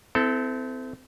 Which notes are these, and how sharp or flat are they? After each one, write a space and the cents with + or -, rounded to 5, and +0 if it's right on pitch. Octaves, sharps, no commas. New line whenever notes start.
C4 -30 E4 +0 A4 +0